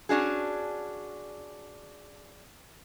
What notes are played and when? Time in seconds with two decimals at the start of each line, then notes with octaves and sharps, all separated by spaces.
0.09 C#4 D4 F#4 G#4